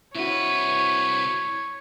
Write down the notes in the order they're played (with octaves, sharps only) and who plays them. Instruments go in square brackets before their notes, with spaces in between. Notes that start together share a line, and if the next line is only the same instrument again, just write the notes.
[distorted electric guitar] C2 B4 [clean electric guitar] E4 F#4 [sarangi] C#5